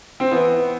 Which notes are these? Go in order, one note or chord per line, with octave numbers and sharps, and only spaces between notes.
C4
E3 B3